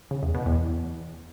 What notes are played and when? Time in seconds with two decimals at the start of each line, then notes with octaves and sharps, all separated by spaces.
0.11 C#3
0.23 E2
0.34 B2
0.46 E2